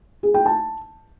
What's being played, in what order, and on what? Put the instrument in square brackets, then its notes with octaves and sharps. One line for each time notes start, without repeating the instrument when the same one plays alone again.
[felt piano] G#4
G5
A5